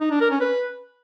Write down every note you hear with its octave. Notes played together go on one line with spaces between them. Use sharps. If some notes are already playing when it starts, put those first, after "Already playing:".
D#4
D4
A#4
C#4
B4